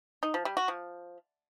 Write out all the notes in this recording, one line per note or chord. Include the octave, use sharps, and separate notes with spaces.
D#4
F3
G3
F#4
F3